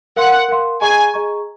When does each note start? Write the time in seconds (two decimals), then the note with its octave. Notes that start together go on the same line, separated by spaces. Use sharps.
0.16 A#4 F5 F#5 C6
0.49 A#4 F5 C6
0.81 G#4 D#5 G#5 A#5 C#6
1.14 G#4 D#5 A#5 C#6